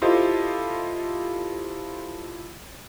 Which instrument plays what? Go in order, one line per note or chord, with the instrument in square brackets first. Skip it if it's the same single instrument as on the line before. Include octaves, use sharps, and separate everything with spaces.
[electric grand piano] E4 F4 G4 A4 C5 D#5